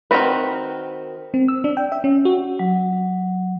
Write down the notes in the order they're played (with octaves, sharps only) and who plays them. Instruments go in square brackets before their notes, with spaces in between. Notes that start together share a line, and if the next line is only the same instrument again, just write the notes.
[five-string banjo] D#3 A#3 C4 F#4 B4
[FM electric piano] C4
E6
D4
G5
E5
C#4
F#4
[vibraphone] F#3